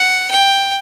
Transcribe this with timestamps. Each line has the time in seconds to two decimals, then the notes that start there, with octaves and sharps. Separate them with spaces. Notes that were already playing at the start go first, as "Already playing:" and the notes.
Already playing: F#5
0.31 G5